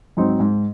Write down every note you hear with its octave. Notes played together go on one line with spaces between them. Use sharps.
G#2 F#3 C4 D#4
G#2